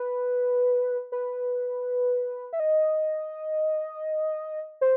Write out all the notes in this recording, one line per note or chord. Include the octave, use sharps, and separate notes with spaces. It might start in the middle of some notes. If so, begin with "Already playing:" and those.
Already playing: B4
B4
E5
D#5
C5